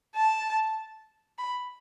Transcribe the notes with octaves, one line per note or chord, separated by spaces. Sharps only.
A5
B5